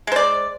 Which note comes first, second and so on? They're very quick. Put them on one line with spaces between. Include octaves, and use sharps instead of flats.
G#3 C5 D5